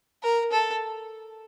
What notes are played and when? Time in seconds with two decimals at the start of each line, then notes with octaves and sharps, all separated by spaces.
0.23 A#4
0.52 A4